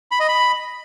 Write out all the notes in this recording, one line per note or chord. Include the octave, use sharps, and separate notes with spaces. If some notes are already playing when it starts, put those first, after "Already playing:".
B5
D#5
B5